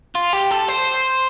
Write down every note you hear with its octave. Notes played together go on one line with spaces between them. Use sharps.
F4
G4
A4
C5